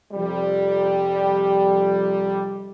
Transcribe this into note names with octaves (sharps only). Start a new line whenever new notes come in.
F2 C3 G3